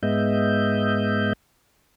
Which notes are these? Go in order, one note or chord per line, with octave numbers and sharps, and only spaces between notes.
G#2 G#3 B3 D#5 E5 G6